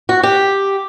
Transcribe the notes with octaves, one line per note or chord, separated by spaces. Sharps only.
F#4
G4